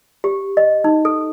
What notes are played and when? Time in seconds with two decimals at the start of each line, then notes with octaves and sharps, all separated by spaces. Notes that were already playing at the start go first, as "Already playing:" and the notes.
0.24 G4
0.57 D#5
0.84 D#4
1.05 A4